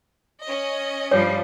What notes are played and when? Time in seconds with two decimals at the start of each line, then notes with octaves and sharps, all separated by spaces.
0.43 C#4 D#5
1.11 G2 F3 G3 C#5